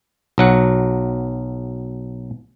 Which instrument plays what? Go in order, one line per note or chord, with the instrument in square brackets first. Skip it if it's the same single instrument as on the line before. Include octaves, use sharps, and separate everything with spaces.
[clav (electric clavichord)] B1 F#3 F#5